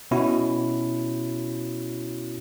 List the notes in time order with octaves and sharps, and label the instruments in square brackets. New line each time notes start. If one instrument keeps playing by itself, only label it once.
[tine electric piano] B2 C#4 E4 F#4